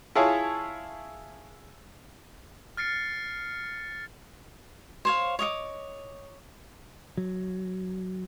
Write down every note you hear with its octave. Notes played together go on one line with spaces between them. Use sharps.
E4 F4 G#4 C#5 A5
F6 A6 C7 C#7
C5 C#5 F5
C#5 D#5 E5 D6
F#3